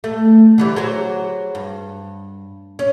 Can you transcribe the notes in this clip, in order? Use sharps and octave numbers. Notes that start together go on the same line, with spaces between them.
A3
D3 E3 G3
F#3 G#4 C5
G2
C#4